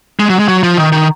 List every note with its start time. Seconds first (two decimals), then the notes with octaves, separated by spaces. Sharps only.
0.20 G#3
0.30 F#3
0.39 G#3
0.48 F#3
0.63 F3
0.77 D#3
0.92 D#3